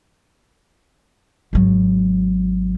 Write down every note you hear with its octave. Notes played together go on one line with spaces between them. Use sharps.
G#1 F#3